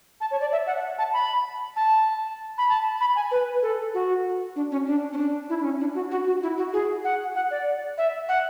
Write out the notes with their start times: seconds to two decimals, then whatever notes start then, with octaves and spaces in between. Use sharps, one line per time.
0.21 A5
0.31 C#5
0.41 D5
0.52 E5
0.67 F#5
0.98 A5
1.14 B5
1.76 A5
2.58 B5
2.69 A5
3.01 B5
3.16 G#5
3.31 B4
3.62 A4
3.94 F#4
4.56 D4
4.72 C#4
4.87 D4
5.13 C#4
5.18 D4
5.50 E4
5.59 D4
5.64 C#4
5.80 D4
5.95 F#4
6.11 F#4
6.27 F#4
6.43 E4
6.58 F#4
6.73 G#4
7.04 F#5
7.35 F#5
7.51 D5
7.98 E5
8.29 F#5